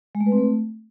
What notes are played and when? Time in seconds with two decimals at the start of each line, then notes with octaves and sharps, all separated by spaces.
0.15 G#3
0.20 A3
0.26 B4
0.32 C4
0.38 A3